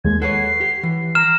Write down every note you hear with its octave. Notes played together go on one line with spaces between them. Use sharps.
D#2 G#3 G#6
A4 B4 C#5 F#5 C7
G4
E3
A#5 F6 E7